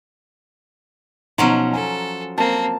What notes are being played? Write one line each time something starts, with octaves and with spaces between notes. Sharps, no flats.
B2 F3 F#3 C#4 D#4 A#5
A4 G#5
A#3 C4 A5